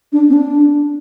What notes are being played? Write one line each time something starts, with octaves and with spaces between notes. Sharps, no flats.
D4
C4
D4